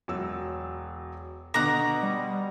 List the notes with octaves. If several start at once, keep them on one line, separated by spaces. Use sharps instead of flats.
E1 F#3 E6
B2 D3 F#5 A#5 D6
G3